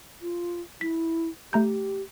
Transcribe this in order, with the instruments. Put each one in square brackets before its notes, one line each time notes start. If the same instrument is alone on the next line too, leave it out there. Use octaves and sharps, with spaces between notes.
[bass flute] F4
[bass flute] E4 [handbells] B6
[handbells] A3 A#5 G6 [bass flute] G4